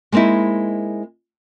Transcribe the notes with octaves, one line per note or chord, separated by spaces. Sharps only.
G#3 A#3 C4 D#4 E4